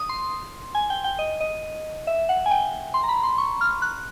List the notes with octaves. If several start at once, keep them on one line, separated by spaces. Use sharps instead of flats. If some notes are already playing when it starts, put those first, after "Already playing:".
Already playing: D#6
C6
G#5
G5
G5
D#5
D#5
E5
F#5
G#5
G5
C6
A#5
B5
C6
C#6
F6
F#6